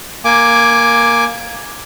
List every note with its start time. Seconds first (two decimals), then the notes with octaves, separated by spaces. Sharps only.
0.25 A#3 G#5 D6